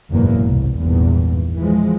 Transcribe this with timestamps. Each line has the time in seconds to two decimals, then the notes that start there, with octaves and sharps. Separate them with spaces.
0.12 F#1 E2 G#2 B2 E3 A#3
0.46 C2
0.82 G#1 E2 G2 A#2
1.60 E3 F3 G#3